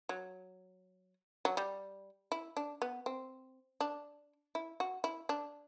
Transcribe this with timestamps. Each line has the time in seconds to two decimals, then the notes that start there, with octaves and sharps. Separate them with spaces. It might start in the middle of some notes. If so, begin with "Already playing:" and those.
0.09 F#3
1.45 F#3
1.57 G3
2.32 E4
2.57 D4
2.82 B3
3.06 C4
3.81 D4
4.55 E4
4.80 F#4
5.04 E4
5.29 D4